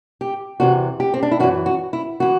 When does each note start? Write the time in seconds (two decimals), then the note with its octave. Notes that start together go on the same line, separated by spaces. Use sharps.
0.21 G4
0.60 E2 C3 E3 F#4
1.00 G4
1.14 C4
1.23 D4
1.31 E4
1.40 F#2 E3 F#4
1.66 F#4
1.93 E4
2.20 E3 F#4